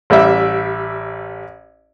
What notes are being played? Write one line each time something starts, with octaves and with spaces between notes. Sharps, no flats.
A1 G3 E5